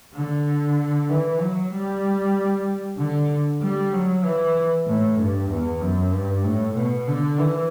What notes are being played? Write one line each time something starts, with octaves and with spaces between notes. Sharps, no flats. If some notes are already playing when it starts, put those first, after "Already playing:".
D3
E3
F#3
G3
D3
G3
F#3
E3
A2
G2
E2
F#2
G2
A2
B2
D3
E3